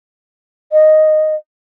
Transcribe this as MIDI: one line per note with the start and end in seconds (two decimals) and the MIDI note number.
0.72 1.35 75